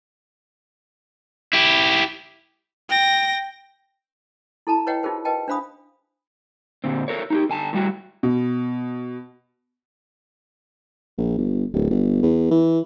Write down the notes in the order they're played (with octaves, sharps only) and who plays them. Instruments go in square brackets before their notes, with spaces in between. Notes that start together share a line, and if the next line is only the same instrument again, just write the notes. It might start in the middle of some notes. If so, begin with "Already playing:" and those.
[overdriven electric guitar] E4 G4
[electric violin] G5 A#6
[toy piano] E4 A4 A5 A#5
B4 C#5 D#5 F#5 G5
D#4 F4 F#4 G#4 A#4 C5
B4 D#5 G5 A5
D4 C5 F5 B5 D#6
[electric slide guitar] A#2 D3 C4
A4 A#4 C#5
D#4 F#4 G4
D3 G#5 A5
A2 G3 F#4
[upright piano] B2
[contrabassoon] A#1
G1
D1
G1
E2
E3